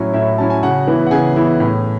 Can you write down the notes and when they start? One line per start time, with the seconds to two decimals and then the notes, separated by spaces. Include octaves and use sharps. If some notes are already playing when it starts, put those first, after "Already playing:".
Already playing: A2 F#3 C#4 E4 F#4
0.13 A2 E4 E5
0.38 F#3 C#4 E4 A5
0.50 G#5
0.63 C#3 F#4 F#5
0.87 E3 B3 E4
1.06 F#5
1.11 C#3 G#4 G#5
1.36 E3 B3 E4
1.60 A2